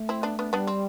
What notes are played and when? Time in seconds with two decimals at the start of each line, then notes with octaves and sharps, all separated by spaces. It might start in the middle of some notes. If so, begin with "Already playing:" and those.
Already playing: A3
0.09 C4 E4
0.23 B3 D4
0.39 B3 D4
0.53 G3 B3 D4
0.67 C4